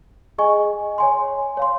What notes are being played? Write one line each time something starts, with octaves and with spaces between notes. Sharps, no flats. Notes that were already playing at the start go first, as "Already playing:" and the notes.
G#4 D#5 G#5 C#6
C#5 G#5 C6
C#5 F5 C6